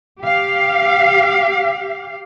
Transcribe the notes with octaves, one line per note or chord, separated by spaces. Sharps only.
G4 F5